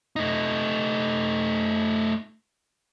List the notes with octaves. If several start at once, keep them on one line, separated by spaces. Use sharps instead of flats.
A3 D#4